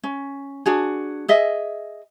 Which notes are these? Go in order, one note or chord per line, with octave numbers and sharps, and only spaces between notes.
C#4
D4 F#4 G#4
G#4 D#5 E5